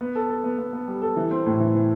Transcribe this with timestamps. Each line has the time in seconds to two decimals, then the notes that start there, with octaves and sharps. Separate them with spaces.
0.01 B3
0.15 A4
0.30 A4
0.44 B3
0.58 B3
0.73 B3
0.88 G3
1.02 A4
1.16 E3
1.31 C4
1.46 A2
1.60 E3
1.75 E3